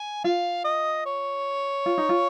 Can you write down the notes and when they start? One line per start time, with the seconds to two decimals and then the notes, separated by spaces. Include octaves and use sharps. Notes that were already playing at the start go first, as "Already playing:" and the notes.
Already playing: G#5
0.24 F4 F5
0.64 D#5
1.06 C#5
1.86 F4
1.98 D#4
2.09 F4